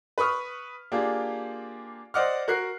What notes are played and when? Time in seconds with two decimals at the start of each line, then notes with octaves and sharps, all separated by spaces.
0.18 B4 B5 C#6 D#6 F6
0.92 A#3 D4 F4 G4 G#4
2.14 C5 D5 D#5 F#5 D6 F6
2.48 F#4 A#4 F#6 C7